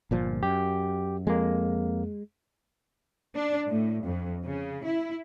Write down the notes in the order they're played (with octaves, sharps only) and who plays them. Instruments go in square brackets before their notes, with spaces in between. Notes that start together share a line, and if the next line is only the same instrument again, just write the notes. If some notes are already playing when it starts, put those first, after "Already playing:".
[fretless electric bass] G1 A#2 F3
[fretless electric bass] F#2 [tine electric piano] G4
[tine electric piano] F2 A#3 [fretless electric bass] G#3
[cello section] D4
A2
F2
C#3
E4